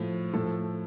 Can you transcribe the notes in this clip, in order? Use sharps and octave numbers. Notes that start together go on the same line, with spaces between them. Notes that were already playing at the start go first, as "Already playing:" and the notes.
Already playing: A2 F3
A2 F3 A4